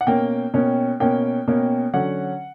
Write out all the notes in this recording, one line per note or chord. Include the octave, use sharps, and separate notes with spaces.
F#5
B2 A#3 C#4 G5
B2 A#3 C#4
B2 A#3 C#4 G5
B2 A#3 C#4
D3 F#3 C#4 F#5